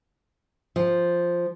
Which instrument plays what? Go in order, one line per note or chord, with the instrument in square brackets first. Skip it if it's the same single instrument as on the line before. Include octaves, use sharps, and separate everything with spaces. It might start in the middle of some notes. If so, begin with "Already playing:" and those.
[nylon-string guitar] F3